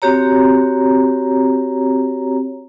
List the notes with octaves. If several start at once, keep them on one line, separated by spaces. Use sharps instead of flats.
C4 F#4 G4 C#5 A#5